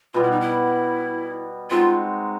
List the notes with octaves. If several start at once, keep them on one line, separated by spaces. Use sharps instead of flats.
B2 G3 B3 F4
E4
D#4
E4
G#3 C4 D#4 F4 F#4